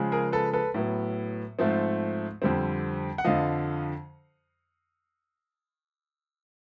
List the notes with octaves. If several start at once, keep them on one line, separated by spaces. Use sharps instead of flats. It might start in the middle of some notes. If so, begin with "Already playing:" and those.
Already playing: C#3 F3 G#3
G#4 A#4
A4 B4
A4 B4
A2 F#3 B3
G#2 F3 A3 C4
F2 D3 G3 C4
F#5
F2 D3 F3 D#5 F5